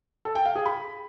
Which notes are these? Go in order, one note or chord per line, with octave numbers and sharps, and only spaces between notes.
A4
G5
F5
G#4
B5